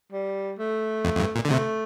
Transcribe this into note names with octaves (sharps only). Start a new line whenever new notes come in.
G3
A3
F2
F2
G2
A#2
D3
C3 A3